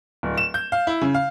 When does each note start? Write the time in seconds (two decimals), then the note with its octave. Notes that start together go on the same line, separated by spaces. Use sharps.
0.23 D1
0.37 E7
0.54 G6
0.72 F5
0.87 E4
1.01 C#3
1.14 F5